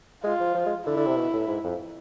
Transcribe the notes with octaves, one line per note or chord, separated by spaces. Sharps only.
G#3 F4
F3
F3
G#3
D3 E4
D3
C3
B2
A2
G#2
F2